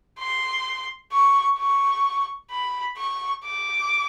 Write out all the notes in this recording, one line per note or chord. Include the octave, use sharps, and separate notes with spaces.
C6
C#6
C#6
B5
C#6
D6